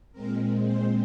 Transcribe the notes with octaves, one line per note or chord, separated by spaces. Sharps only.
A#2 G#3 C4 A#4
C5